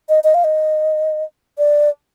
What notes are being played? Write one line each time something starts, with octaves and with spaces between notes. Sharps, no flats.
D#5
D#5
F5
D#5
D5